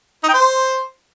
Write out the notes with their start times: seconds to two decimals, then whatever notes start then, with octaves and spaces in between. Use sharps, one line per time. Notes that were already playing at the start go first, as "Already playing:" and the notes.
0.23 D#4
0.29 G5
0.34 C5